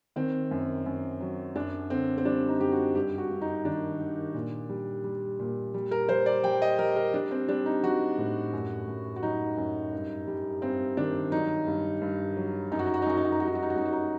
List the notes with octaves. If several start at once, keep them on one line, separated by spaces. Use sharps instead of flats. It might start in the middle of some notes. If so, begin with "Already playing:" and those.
D#3 C4
F#2
F#2
F#3
F#2 D4
D3 C4
C4
G3 D4
D#4
F#2 G4
F#4
G2 G4
F#4
G2
D#4
D#3 D4
D#3
A#2
G3
G3
A#2
G3
A#4
G3 C5
D5
G3 G5
D#5
G3 A#4
A#4
G3 D4
C4
G3 D4
D#4
G3 F#4
A2
F#2
F#2
F#4
F#3 D#4
F#2
G2
G3
G2 C4
D#3 D4
F#3 D#4
G2
G2
F#3
F#2 D#4
F#4
D#4
F#4
D#4
F#2 F#4
D#4
F#4
D#4
G3 F#4
D#4
F#4
D#4
F#4
F#2 D#4
F#4
D#4